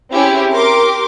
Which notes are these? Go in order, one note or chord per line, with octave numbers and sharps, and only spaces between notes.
C4 C#4 E4 G4 G#4
G4 A#4 C6 D6